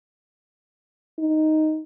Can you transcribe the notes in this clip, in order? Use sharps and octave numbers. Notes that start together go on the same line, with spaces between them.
D#4